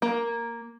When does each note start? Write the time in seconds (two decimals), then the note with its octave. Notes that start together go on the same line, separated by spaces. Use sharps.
0.02 A#3